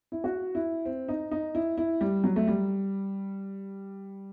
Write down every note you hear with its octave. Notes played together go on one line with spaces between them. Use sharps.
E4
F#4
E4
C4
D#4
D#4
E4
E4
G3
F#3
A3
G3